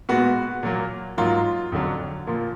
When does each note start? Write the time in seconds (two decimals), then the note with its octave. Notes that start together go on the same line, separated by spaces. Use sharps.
0.09 A#2 G#3 B3 F#4
0.63 A#2 F#3 A#3
1.17 G#2 F#3 A#3 F4
1.72 F2 D3 F#3
2.27 A#2 F3 A#3